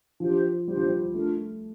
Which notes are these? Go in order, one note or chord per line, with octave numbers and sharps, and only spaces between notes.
F3 D4 G4 C5
G3 D4 G4 C5
F3
G3
A3 D4 F4 A#4